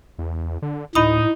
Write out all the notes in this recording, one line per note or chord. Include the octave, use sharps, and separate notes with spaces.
E2
D3
D2 A2 D#4 B5 D#6